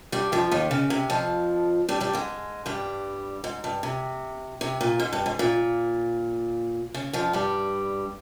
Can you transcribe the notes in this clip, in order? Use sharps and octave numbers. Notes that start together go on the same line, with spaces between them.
G2 G3
F2 F3
D#2 D#3
C#3
C3
F2 F3
G2 G3
G2 G3
G#2 G#3
G2 G3
G#2
G2
C3
C3
A#2
G#2
G2
G#2
A#2
C#3
F2 F3
G2 G3